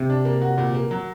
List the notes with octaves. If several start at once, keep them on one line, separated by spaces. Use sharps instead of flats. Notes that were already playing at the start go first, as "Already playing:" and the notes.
Already playing: C3
D4
A#3
F#4
A#2
A#3
F#3